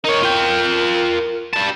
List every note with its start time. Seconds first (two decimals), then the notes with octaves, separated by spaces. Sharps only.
0.05 D#4 A#4 C#5
0.23 F4 G5
1.53 G3 A5